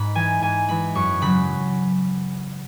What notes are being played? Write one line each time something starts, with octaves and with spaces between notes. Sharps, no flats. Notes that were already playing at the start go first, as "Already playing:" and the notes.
Already playing: G#2 B5
E3 G#3 G#5
G#2 G#5
E3 G#3 B5
F#2 C#6
C#3 F#3 B5